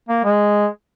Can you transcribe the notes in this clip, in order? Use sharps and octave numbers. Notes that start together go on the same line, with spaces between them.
A#3
G#3